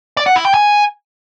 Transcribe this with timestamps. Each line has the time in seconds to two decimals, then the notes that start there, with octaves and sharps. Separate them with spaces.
0.17 D5
0.26 F#5
0.36 E4
0.45 G5
0.54 G#5